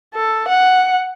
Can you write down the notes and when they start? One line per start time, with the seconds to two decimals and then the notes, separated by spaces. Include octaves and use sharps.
0.14 A4
0.49 F#5